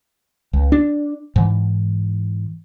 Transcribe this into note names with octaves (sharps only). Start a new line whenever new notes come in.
C#2
D4
G#2 E3